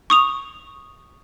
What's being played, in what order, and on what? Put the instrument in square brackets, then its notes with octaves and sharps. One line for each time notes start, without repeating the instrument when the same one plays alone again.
[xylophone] C#6 D#6 F7